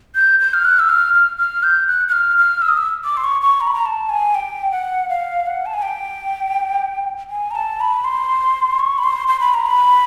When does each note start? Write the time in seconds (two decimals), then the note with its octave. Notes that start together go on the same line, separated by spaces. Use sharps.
0.15 G6
0.40 G6
0.54 F6
0.65 F#6
0.79 E6
0.89 F6
1.14 F6
1.38 F6
1.63 G6
1.87 F#6
2.08 F#6
2.12 F6
2.37 F6
2.62 E6
2.69 D#6
2.77 E6
3.05 D6
3.17 C6
3.24 C#6
3.42 C#6
3.61 A#5
3.67 B5
3.75 A#5
3.86 A5
4.09 G#5
4.35 G5
4.71 F#5
5.09 F5
5.46 F#5
5.66 A5
5.74 G#5
5.82 G5
7.30 G#5
7.51 A#5
7.55 A5
7.80 B5
8.04 C6
8.79 C#6
8.98 B5
9.04 C6
9.28 C6
9.40 B5
9.54 A#5
9.66 B5